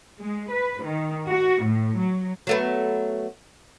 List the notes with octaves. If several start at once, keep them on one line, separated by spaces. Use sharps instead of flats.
G#3
B4
D#3
F#4
A2
F#3
F#3 A3 B3